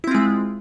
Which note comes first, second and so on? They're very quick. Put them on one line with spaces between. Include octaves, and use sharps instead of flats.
E4 C4 F4 G#3